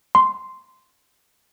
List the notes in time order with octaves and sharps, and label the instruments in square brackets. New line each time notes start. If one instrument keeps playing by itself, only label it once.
[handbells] C6